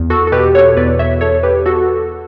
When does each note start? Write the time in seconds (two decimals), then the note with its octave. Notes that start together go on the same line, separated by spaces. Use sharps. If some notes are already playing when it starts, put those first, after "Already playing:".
Already playing: E2
0.10 F#4 A4
0.27 A4
0.32 B2 G4 B4
0.55 A4 C#5
0.77 E2 B4 D5
0.99 C#5 E5
1.21 E2 A4 C#5
1.43 G4 B4
1.66 F#4 A4